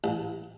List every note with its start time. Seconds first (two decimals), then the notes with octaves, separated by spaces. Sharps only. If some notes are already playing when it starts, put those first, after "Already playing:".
0.04 A1